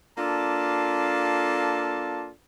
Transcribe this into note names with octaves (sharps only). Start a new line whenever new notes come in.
A#3 D4 F4 A4 A5